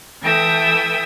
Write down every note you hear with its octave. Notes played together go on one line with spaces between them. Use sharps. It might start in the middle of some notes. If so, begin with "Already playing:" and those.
E3 A4 E5 G5 D#6 E6